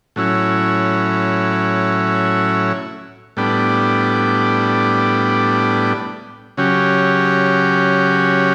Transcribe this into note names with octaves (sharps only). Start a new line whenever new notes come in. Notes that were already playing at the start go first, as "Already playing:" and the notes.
A2 F#3 C#4 E4
A2 G3 B3 D4
C#3 F#3 C#4 G4